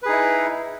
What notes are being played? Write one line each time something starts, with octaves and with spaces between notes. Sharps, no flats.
D#4 E4 G#4 B4